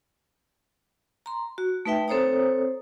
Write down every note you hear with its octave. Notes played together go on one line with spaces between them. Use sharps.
A#5 C6
F#4
A3 D#4 B4 E5 G5
C4 A4 C5 C#5 A#5 D#6